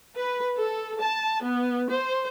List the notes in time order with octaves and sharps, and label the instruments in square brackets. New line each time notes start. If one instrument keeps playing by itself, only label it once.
[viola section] B4
A4
A5
B3
C5